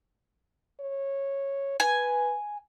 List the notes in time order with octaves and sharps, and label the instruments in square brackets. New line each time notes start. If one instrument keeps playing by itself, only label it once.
[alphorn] C#5
[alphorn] B4 [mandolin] G#5